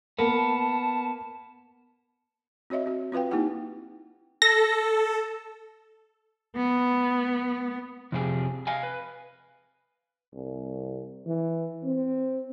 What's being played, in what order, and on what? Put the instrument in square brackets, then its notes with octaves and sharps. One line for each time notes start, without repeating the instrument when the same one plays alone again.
[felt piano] A#3 [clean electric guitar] B3 [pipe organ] A5
[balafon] C4 F#4 C#5 D#5 E5
C4 F#4
C4 F4 B4 F5 G5
A#3 D#4 E4 G4 F#5 G5
[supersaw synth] A4 [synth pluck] A#6
[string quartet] B3
[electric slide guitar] F2 C3 F3 C4 G4 G#4
D#5 F5 G#5
B4
[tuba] C2
E3
C4